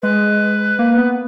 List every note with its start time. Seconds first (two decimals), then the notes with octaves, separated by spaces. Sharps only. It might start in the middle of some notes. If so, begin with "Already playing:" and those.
0.02 G#3 B4
0.79 A#3
0.98 B3